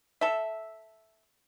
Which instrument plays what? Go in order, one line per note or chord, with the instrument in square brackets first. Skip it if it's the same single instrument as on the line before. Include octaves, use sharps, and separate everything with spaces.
[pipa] A4 E5